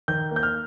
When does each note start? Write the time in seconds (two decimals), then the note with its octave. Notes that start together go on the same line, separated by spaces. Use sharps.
0.08 D#3 G6
0.31 A#3
0.36 G6
0.43 F6